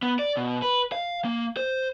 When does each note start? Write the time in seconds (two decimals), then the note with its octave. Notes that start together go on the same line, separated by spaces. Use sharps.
0.02 B3
0.19 D5
0.37 B2
0.62 B4
0.92 F5
1.25 A#3
1.57 C5